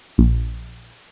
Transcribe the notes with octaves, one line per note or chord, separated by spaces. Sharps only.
A#1